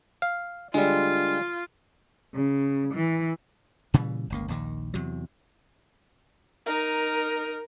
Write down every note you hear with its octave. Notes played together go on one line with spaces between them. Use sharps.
F5
D3 G3 G#3 F4
C#3
E3
A#2 C#3 E3 G3
G1 C#2 A#3
A#1 D#2 D#3
E2 C3 F#3
D#4 A#4